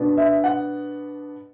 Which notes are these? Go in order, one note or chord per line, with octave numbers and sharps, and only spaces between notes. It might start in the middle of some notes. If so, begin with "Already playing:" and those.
Already playing: B2 B3 D4
E5
F#5